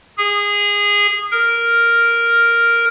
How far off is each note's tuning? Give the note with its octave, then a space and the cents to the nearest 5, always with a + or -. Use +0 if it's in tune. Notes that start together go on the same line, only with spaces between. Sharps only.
G#4 -20
A#4 +0